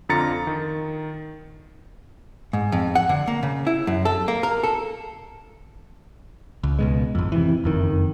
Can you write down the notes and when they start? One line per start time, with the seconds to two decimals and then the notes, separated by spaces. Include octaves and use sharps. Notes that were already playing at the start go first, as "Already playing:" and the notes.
0.09 F2 D3 F4 A#5 A6 C#7
0.47 D#3
2.53 G#2
2.72 F2
2.95 F#5
3.09 D3
3.28 A#3
3.43 C#3
3.67 E4
3.87 F#2
4.05 A4
4.28 A#3
4.43 A#4
4.63 A4
6.63 C#2
6.79 C#2 B2 G#3
7.15 G#1 F2
7.32 C3 E3
7.64 F#1 F2 D#3